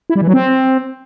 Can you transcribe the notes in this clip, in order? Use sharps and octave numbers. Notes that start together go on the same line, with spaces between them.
E4
G3
E3
F#3
C4